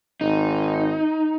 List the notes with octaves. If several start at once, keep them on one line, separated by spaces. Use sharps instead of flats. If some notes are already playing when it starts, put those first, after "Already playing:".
G#1 D#4